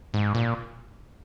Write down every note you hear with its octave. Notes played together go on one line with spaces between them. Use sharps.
G#2
A#2